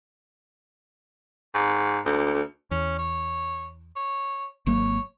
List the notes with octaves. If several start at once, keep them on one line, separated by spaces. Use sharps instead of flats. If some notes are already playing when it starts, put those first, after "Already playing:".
G#2
D2
E2 C#4
C#5
C#5
G#1 F#3 A#3 C#5